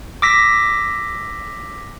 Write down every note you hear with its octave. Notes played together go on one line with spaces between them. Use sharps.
D6 E6 A#6 B6